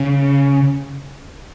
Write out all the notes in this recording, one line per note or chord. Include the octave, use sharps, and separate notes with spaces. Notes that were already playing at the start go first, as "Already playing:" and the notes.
Already playing: C#3